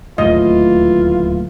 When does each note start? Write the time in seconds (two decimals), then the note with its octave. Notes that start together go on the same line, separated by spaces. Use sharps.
0.18 D1 D#2 A2 E3 F4 D#5